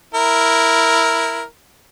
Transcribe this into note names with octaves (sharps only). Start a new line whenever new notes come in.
E4 A#4